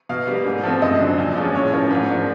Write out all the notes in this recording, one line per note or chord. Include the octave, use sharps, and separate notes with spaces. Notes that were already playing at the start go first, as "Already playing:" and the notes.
B2 F5
G3 A#3
G#2
F3 A3 C4
F#2 D#5
D3 F#3
A#2
F3 G#3 C#4
A2 C#5
F3 A#3 C#4
G#2
F3 A#3 D4